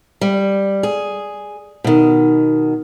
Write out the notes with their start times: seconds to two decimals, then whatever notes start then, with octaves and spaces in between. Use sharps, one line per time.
0.21 G3
0.83 G#4
1.84 B2 D#3